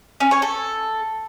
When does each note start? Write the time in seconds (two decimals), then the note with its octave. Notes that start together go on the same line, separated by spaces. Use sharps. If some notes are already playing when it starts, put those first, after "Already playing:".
0.20 C#4
0.31 C#5
0.42 A4